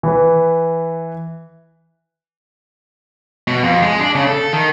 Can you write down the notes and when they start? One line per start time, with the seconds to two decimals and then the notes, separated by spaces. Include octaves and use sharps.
0.03 E3 B4
3.48 B2
3.63 F2
3.82 G#3
4.00 D4
4.15 C#3
4.27 A4
4.53 D#3